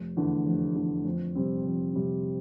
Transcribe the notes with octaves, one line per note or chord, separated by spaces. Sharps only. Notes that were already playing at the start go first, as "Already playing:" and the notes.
Already playing: F1
E2 D3 A3
F1
E2 D3 A3
F2
C3 G3 C4
F2
C3 G3 C4